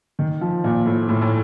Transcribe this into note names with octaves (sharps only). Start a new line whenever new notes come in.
D#3
F3
A#2
A2
A2
A2